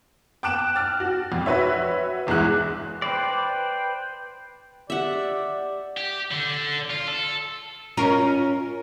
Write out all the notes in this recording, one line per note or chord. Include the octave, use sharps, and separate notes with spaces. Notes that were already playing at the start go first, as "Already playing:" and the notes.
G5 A5 D6 F#6 D7 E7
F6 A6
F#4
F2
F#4 B4 C#5 E5
G1 E2 G#3 E4 F#6
B4 C5 D5 G5
G4 D5 E5 F#5
G4
D3
F4
A4
C#4 F4 A#4